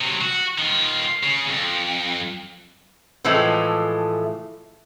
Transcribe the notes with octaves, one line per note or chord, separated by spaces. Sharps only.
C3 F#3
F#4
D#3 F4
C#3
F2
A2 E3 F3 G#3 A3